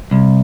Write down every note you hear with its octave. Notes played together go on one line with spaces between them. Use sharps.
C2